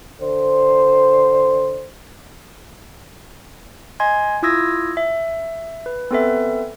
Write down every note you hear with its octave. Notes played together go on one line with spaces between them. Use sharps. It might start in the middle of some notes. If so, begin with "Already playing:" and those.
D3 C5
D#5 G#5 C6 G#6
E4 F4 D#6 E6 G#6 A#6
E5
B4
B3 C4 A4 B4 E5